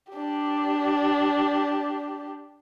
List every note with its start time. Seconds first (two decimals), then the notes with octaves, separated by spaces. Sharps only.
0.12 D4 G4